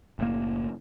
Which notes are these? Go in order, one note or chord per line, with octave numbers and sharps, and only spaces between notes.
F#1 A2 A#3